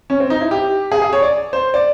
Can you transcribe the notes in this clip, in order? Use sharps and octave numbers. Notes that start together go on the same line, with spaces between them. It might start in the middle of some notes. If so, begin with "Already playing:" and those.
C#4
C4
D#4
E4
G4
G#4
G#4
C#5
D5
C5
D5